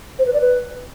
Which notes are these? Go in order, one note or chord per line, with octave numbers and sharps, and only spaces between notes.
C5
B4
D5
B4